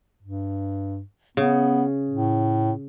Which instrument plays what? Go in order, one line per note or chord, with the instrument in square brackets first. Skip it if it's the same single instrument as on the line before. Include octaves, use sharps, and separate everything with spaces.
[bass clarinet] G2
[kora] C#3 [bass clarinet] B3
[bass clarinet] A2